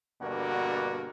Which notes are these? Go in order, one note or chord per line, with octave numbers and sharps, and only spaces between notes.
G2 B2 D3 A#3 F#4